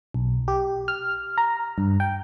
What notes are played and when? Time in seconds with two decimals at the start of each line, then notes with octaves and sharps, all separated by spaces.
0.14 B1
0.48 G4
0.88 F6
1.38 A#5
1.78 G2
2.00 G5